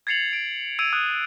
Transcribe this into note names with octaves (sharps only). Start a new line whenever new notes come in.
G#6 A6 C7 C#7 F7 F#7
D7
E6 G#6 D7 D#7 F7
D#6 F#6 D#7